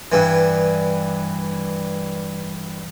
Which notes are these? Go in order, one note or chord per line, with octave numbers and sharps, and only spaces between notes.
G2 E3